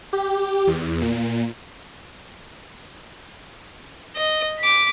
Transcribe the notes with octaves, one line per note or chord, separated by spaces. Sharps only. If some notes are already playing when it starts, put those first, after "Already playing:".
G4
E2
A#2
D#5
D6 B6